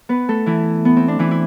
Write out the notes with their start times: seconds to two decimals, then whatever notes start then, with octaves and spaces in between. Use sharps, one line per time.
0.09 B3 B4
0.28 A3 A4
0.46 E3 E4
0.85 B3
0.97 C4
1.08 D4
1.19 E3 E4
1.31 E4